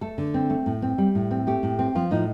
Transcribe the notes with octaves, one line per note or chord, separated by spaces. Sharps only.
A3 A4
D3
C4
A3
A2
C4
G3
A2
C4
A3 G4
A2
C4
F3 F4
A2 D#4